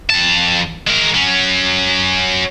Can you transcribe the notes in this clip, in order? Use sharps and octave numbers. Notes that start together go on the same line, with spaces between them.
F2 A5
G#3 A#4
F#3 C#4